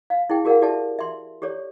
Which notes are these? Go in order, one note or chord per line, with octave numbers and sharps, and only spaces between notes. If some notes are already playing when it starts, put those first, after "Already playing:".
F5
E4 G#4 G5
F#4 G#4 A#4 D5 F5 F#5
F#4 G4 A4 D5 E5 A5
E5 C6
G4 A4 C#5 D5